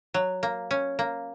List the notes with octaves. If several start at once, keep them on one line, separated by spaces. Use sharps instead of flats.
F#3
A#3
C#4
A#3